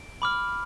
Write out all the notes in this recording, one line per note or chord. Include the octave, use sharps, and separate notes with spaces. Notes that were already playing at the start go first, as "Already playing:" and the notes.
Already playing: D7
B5 D6 F6